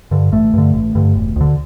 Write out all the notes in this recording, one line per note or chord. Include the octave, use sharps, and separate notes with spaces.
G2 D3
A1 A3
G2 D3
A1
G2 D3
E1
D2 D3